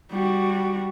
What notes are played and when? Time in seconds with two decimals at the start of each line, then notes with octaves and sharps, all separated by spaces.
0.11 G3 F#4